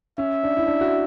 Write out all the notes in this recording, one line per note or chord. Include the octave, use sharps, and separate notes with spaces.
C#4 E5
D4
E4
D4
F#4